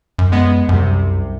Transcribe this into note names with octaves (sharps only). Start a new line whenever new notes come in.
F#2
G#3 B3
C2 F#2 C3